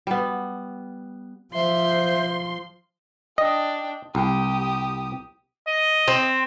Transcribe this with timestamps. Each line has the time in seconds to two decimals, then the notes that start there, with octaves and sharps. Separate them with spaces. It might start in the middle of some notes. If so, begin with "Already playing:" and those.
0.07 G3 B3
1.54 F3 C5 E5 C6
3.38 D4 D#5 G5
4.15 C2 G4 D#6
5.67 D#5
6.08 C4